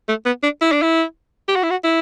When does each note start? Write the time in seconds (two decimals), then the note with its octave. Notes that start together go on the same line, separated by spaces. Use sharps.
0.08 A3
0.26 B3
0.43 D4
0.62 E4
0.72 D4
0.82 E4
1.48 G4
1.56 F#4
1.63 E4
1.70 F#4
1.84 E4